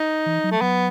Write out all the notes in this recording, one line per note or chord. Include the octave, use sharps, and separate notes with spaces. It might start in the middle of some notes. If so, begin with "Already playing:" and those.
Already playing: D#4
E3
F#3
A3
F#3 B3